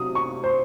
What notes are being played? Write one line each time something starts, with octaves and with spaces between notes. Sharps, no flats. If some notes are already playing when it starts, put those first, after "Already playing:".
Already playing: C3 F#3 D#6
C#6
C5